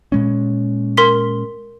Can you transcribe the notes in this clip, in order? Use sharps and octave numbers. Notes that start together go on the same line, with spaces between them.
A#2 G#3 C#4
A#4 C6 B6